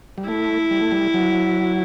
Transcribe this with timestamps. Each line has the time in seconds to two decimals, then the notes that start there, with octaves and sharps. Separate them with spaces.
0.18 G3
0.28 A3 E4
0.71 G3
0.81 A3
0.92 G3
1.14 F#3